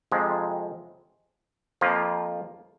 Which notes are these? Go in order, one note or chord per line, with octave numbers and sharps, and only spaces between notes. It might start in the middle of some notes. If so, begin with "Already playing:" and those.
F2 C3 F3 G#3
F2 F3 A#3 F4